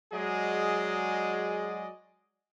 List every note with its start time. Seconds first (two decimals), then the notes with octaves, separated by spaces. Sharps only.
0.13 F#3 G#3 F#4 G#4 D5 D#5